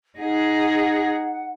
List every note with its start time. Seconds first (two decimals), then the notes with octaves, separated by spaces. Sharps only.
0.18 D#4 G#4 F#5